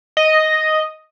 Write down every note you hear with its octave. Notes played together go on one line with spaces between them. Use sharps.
D#5